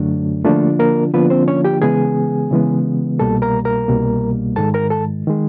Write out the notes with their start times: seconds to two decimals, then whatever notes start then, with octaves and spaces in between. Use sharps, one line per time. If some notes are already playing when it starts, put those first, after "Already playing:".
Already playing: F#2 D3 F#3 A3 D4
0.44 D3 F3 A3 A#3 D4 F4 A4
0.79 A#3 A#4
1.14 D3 F3 A#3 B3 D4 F4 B4
1.30 C4 C5
1.48 C#4 C#5
1.65 G4 G5
1.82 C#3 E3 G#3 B3 G#4 G#5
2.51 C#3 E3 G#3 B3
3.19 C2 B2 G3 A#3 A4 A5
3.42 A#4 A#5
3.65 A#4 A#5
3.88 C2 B2 G3 A#3
4.56 G#2 D#3 G#3 A4 A5
4.74 A#4 A#5
4.90 A4 A5
5.27 D#3 G#3